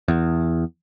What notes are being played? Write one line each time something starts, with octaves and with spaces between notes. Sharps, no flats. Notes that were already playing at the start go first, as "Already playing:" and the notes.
E2